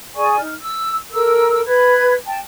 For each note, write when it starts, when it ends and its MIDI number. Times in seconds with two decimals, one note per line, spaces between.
0.14 0.37 68
0.14 0.37 74
0.14 0.37 80
0.14 0.37 85
0.38 0.53 63
0.38 0.53 89
0.60 0.96 88
1.11 1.61 69
1.11 1.61 70
1.11 1.61 88
1.66 2.13 71
1.66 2.13 83
1.66 2.13 92
2.25 2.38 79
2.25 2.38 81